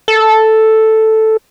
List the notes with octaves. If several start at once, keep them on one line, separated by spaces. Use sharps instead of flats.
A4